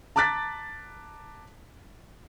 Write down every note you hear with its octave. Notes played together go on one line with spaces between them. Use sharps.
A5 A#5 D6 F#6 A6 B6